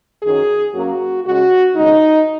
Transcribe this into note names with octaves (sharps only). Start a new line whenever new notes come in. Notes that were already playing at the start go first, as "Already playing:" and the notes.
F#2 D#3 F#3 C#4 G#4
F#2 F#3 A#3 C#4 F#4
C#3 G#3 C#4 F#4
D#2 C#3 G#3 D#4